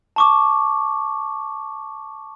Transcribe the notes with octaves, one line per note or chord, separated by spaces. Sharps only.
A5 C#6 D6